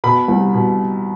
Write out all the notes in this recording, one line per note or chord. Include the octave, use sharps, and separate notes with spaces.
B2 B5
C2
B2